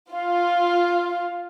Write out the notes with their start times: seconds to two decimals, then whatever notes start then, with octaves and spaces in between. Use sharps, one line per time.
0.12 F4 F5